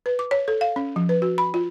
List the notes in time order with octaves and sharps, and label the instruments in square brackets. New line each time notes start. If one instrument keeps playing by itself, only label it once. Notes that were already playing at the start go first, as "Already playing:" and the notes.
[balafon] B4
D6
C#5
A4
F5
C#4
F3
B4
F#4
B5
F4